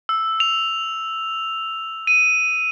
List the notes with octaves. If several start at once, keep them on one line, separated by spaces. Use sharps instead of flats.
E6
F7
D#7